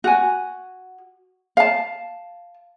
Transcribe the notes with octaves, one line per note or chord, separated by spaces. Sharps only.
F#4 G#5
F5 A5